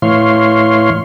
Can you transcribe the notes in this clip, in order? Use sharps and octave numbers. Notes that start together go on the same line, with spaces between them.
A2 E3 C#5 F5 C6